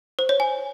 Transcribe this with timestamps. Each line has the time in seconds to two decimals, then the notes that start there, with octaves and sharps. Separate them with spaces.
0.19 C5
0.29 C#5
0.40 G#5